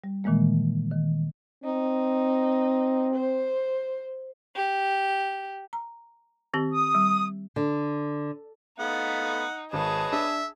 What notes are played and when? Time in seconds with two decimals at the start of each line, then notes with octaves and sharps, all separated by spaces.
0.04 G3
0.24 A#2 D#3 E3 G#3 A#3
0.91 D#3
1.64 C4 D#4
3.14 C5
4.56 G4
5.73 A#5
6.54 D#3 C4 G4
6.71 D#6
6.95 G3
7.56 D3
8.79 A3 B3 D#4 F5 F#5
9.73 G#1 G#4 B4 C#5 D#5 A5
10.12 D4 E5